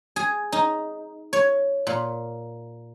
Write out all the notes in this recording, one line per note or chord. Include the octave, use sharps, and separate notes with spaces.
G#4
D#4
C#5
A#2